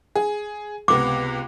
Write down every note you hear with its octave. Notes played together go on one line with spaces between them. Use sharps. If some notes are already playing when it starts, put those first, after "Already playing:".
G#4
C#2 C3 B3 D6